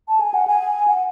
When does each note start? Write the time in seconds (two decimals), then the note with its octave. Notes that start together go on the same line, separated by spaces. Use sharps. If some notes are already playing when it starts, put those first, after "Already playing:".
0.08 A5
0.20 G#5
0.34 F#5
0.47 G#5
0.88 F#5